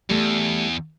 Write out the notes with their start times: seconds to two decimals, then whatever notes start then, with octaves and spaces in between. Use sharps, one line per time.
0.10 E2 G3 A3